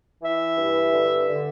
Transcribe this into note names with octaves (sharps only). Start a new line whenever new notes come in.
E3 E5
G2
D3
D3